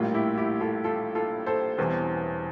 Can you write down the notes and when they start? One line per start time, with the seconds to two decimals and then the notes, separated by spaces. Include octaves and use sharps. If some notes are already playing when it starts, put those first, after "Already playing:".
Already playing: A#1 A2 G3 A#3 F4
0.14 E4 G4
0.38 E4 G4
0.60 F4 A4
0.84 F4 A4
1.15 F4 A4
1.46 A4 C5
1.78 E1 E2 E3 G3 C4